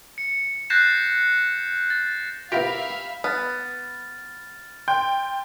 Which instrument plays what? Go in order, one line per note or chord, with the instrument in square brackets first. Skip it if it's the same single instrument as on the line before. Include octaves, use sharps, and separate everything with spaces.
[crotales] C#7
F#6 G6 A6 A#6 C7 E7
A6
[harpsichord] B3 E4 F4 [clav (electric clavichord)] G4 A#4 [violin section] E5 F5 B5
[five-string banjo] B3 [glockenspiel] F6 A6
[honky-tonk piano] G5 [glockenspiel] C6